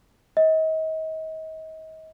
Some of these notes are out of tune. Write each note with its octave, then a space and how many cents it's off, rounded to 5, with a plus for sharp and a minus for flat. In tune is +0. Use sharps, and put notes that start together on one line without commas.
D#5 +35